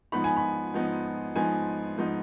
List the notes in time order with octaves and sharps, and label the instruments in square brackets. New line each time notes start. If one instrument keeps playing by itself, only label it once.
[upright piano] G#2 F3 B3 D#4 B5
G#5
B5
G#2 F3 B3 D#4
G#2 F3 B3 D#4 G#5
G#2 F3 B3 D#4